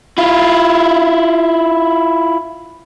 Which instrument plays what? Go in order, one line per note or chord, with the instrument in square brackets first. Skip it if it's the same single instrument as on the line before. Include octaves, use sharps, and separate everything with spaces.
[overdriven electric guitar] E4 F4